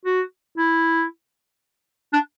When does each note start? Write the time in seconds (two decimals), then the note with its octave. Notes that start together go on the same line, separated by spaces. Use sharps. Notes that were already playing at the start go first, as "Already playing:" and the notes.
0.05 F#4
0.57 E4
2.13 D4